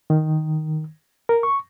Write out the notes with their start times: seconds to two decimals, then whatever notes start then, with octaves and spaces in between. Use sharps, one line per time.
0.10 D#3
1.29 A#4
1.43 C#6